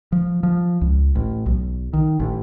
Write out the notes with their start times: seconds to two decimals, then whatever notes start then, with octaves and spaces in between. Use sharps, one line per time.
0.12 F3
0.43 F3
0.81 C#2
1.16 A1
1.46 B1
1.93 D#3
2.20 A1